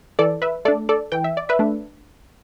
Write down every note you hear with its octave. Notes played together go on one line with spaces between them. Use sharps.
E3 A4 D5
B4 E5
A3 D4 A4 D5
A4 D5
E3 G5
E5
D5
B4 E5
A3 D4